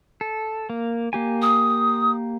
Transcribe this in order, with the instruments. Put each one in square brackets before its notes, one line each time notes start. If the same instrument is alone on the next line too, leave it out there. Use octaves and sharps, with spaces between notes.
[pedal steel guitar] A4
A#3
A#3 G4 G#5
[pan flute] D#6